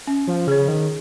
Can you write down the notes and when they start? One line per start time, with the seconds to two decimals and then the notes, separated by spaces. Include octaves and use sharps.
0.07 C#4
0.27 F3
0.47 C#3 G#4 C#5
0.58 C#3
0.68 D#3